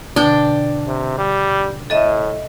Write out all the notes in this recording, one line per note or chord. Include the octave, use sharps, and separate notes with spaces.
B2 D3 D4 G5
C3
G3
A2 A4 D#5 E5